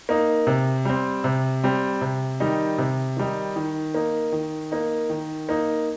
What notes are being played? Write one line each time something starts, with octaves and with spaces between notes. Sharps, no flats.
A#3 D#4
C3
G3 C4
C3
G3 C4
C3
D#3 G3 D#4
C3
D#3 G3 D#4
D#3
A#3 D#4
D#3
A#3 D#4
D#3
A#3 D#4